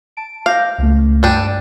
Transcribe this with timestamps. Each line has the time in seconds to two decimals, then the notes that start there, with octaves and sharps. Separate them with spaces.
0.17 A5 D7
0.46 F5 D6 G6 A#6
0.78 C#2 A3
1.23 G2 G3 D4 G5 D#7